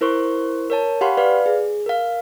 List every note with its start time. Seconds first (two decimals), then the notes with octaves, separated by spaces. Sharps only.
0.01 E4 A#4 C5 C6 C#6
0.70 A#4 C#5 A5
1.01 G4 F5 F#5 B5 C6
1.17 B4 D5 F5
1.46 G#4
1.86 A#4 F5